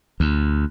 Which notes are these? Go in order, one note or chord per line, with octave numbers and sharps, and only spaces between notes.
D2